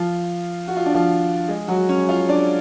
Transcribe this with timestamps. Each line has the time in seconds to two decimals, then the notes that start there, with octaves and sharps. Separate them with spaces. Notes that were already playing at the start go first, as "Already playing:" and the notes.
Already playing: F3 F4
0.68 F#4
0.77 F4
0.86 D4
0.95 F3 F4
1.48 G#3 G#4
1.68 F#3 F#4
1.89 C#4 C#5
2.09 F4 F5
2.29 D4 D5